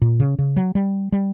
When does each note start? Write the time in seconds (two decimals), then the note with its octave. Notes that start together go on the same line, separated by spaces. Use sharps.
0.02 A#2
0.20 C#3
0.39 C#3
0.57 F#3
0.75 G3
1.12 G3